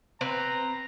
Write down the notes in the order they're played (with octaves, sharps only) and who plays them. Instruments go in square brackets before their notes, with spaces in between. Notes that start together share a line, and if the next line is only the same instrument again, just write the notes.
[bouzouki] C4 B4 [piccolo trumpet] A#5